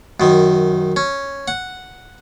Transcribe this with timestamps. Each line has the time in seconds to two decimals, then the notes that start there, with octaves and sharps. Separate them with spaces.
0.20 F#2 D#3
0.96 C#4
1.48 F#5